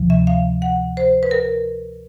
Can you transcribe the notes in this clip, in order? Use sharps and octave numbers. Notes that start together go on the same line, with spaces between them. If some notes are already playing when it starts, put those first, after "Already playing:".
Already playing: D2 C3 F3
E5
F5
F#5
C5
B4
A#4